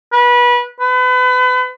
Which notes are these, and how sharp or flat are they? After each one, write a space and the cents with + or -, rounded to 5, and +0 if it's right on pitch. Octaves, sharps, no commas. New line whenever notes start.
B4 -25
B4 +35